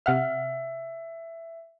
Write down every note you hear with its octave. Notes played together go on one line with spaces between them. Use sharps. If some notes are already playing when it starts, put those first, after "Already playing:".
C3 E5 F#5 F6